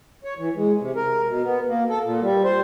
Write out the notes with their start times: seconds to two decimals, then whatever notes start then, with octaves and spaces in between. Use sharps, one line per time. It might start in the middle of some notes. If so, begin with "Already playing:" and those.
0.24 C#5
0.38 E3
0.56 G#3
0.80 C3
0.96 A#4
1.27 B2
1.44 B3
1.68 A#3
1.89 A4
2.04 A#2
2.21 G3
2.44 C5